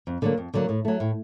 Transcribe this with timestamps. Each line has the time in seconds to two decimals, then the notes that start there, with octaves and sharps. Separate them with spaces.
0.07 F2
0.22 D3 F#3 A#3
0.38 F2
0.54 D3 F#3 A#3
0.69 A2
0.85 F#3 A3
1.00 A2